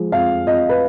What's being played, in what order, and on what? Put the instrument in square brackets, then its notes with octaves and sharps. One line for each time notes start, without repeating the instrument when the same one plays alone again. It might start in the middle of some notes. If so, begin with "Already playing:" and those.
Already playing: [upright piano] F3 G#3
F2 F5
F2 D#5
B4